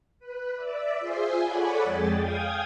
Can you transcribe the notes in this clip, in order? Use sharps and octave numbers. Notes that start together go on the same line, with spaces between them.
B4
D5 E5
F4 G#4 C5 E5 G#5 C6
A4 C#5 D5 F#5 G#5 B5
F2 G#3 G#4 G5 A6
F5 G5 G#5 D#6 G#6